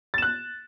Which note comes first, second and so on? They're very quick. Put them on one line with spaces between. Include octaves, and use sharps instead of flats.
A6 E7 F#6